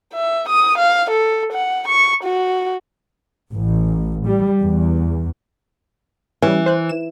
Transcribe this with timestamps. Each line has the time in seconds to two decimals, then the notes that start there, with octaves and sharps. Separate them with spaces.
0.13 E5
0.49 D#6
0.78 F5
1.10 A4
1.53 F#5
1.88 C#6
2.23 F#4
3.52 A1
4.27 G3
4.62 E2
6.42 E3 G3 C#4
6.66 C5 F#6
6.89 E7